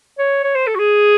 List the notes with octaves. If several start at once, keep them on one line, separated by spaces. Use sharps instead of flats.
C#5
C#5
C5
A4
F#4
G#4